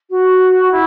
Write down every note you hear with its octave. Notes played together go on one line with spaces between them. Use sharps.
F#4
E4